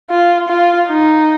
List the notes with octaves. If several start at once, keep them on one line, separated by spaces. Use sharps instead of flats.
F4
F4
D#4